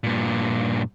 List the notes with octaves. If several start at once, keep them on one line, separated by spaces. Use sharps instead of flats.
G2 A#2